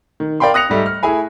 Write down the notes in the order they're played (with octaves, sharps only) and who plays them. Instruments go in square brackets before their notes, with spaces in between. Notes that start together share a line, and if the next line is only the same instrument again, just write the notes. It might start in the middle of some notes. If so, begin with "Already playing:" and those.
[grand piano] D#3
A#4 D5 F5 G5 B5 C6
D#6 F#6 A#6 C#7 F7
G#2 G3 A3
F6
A3 E4 G#4 G#5 B5